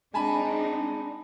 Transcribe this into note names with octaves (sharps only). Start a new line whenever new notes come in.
G#3 C4 D4 D#4 G#5 A5 B5